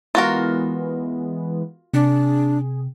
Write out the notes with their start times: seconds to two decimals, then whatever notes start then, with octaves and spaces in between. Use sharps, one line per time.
0.15 E3 G#3 B3 F4 F#4 A#4
1.94 C3 D4 G#4